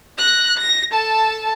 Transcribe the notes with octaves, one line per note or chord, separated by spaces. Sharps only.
F#6 A#6
A#6
A4 A5